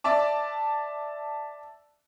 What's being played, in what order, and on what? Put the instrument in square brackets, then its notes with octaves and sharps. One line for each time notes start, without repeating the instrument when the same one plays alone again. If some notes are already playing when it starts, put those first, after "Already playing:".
[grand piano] D5 E5 A5 D6